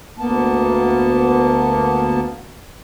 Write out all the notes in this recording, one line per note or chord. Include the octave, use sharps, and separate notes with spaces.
D2 A#3 B3 A5